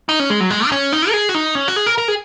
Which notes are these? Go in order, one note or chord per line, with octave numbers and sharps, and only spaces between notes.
D#4
C#4
G#3
F#3
G#3
D#4
C#4
D#4
A#4
G#4
F#4
D#4
C#4
F#4
G#4
A#4
A#4
G#4